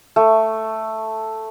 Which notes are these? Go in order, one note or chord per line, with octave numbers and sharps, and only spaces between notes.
A3